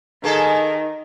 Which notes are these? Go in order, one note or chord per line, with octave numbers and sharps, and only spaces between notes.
D#3 A#3 G#4 A4